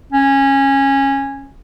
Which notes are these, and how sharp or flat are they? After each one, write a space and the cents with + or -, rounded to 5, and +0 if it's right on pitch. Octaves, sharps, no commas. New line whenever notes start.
C#4 -15